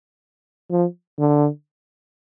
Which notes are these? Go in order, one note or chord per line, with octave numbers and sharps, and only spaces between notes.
F3
D3